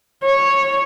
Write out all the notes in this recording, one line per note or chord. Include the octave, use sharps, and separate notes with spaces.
C#5